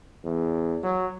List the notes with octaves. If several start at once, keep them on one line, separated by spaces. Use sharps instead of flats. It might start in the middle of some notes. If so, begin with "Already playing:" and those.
E2
F#3